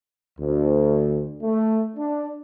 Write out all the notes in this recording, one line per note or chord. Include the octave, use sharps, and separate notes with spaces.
D2
A3
D4